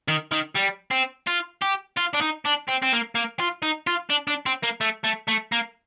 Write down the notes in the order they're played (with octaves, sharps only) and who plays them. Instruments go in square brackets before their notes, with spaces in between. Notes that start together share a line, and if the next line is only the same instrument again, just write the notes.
[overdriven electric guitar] D#3
D#3
G3
C4
F4
G4
F4
D4
D#4
D4
C4
C4
A#3
A#3
F4
D#4
F4
D4
D4
C4
A#3
A3
A3
A3
A#3